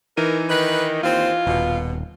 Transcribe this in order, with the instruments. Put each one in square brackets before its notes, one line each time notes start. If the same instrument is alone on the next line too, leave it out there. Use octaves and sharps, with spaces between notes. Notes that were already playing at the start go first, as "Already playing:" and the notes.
[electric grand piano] E3 D#4 D#7 [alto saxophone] A#4
[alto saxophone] D#3 [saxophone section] B4
[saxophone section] D#2 C4 [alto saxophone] F4
[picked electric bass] D#1 [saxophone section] B2